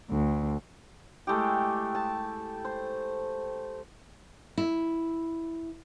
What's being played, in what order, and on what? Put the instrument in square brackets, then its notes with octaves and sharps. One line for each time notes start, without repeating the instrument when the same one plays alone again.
[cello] D2
[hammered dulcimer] G#3 A3 E4 G4
A5
C5
[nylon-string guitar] E4